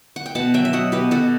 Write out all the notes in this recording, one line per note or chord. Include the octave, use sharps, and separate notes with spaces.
F#5
G5
B2 F#5 A5
F#3 E5 G5
E5
F#3 D#5 F#5
B2 G4 B4
B2 F#4 A4